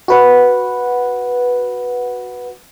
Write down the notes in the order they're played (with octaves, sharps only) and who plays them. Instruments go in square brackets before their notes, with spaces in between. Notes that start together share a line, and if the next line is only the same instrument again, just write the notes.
[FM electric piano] F#4 B4 F#5